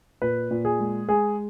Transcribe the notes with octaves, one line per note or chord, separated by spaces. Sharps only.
A#2 B4
A#2
G#4
G#3
G#3 G#4